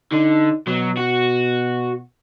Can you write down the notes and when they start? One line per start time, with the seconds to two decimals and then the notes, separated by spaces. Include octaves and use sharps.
0.12 D3 D#4
0.68 B2 F#3
0.98 F#4